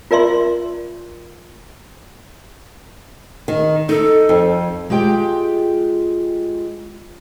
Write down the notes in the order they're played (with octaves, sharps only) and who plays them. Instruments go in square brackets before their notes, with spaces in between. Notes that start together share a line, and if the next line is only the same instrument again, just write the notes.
[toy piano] F4 A#4 D5 E5 C6
[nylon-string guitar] D#3
[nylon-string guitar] D#4 [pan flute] A4
[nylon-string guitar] F2
[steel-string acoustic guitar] G#3 F4 G4 G5